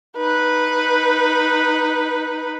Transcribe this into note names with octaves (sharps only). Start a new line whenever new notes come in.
D#4 B4